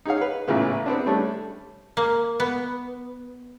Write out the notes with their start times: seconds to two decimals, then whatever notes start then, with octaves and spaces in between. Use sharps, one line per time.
0.06 D#4 G#4 C#5 F5
0.21 B4
0.48 A1 A#2 C#3 B3
0.86 B3 C4 D4
1.06 G3 A3 C#4 D4
1.97 A#3
2.40 B3